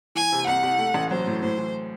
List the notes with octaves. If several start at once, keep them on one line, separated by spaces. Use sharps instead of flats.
E3 G#5
C3
C2 F#5
C2
A3
A1
F#3 C5
A2
A2 C5
E3